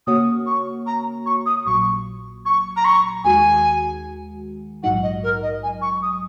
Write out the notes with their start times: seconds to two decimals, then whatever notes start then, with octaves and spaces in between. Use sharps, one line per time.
0.07 C#3 A#3 F#4 C#5 D#6
0.46 C#6
0.86 A#5
1.26 C#6
1.46 D#6
1.65 A#1 A#2 F#3 C#6
2.45 C#6
2.76 A#5
2.85 C#6
3.24 D#2 D#3 G#3 F#4 G#5
4.83 A#1 G#2 F#3 D#4 F#5
5.02 D#5
5.23 A#4
5.42 D#5
5.63 G#5
5.82 C#6
6.02 D#6